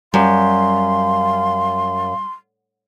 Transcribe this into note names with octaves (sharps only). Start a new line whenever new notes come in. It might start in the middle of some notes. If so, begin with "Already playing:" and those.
F#2 G3 F5 C6